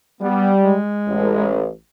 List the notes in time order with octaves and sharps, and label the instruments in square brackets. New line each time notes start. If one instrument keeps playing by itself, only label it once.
[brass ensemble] G3 [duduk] B3
[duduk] G#3
[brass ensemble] A1